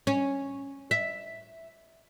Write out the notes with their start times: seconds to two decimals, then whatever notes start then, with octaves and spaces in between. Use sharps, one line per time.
0.07 C#4
0.91 E5